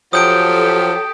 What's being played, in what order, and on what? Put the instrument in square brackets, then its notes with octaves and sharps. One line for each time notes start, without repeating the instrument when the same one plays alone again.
[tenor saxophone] F3 [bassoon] F#3 [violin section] G4 A4 [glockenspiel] D#6 G6 D7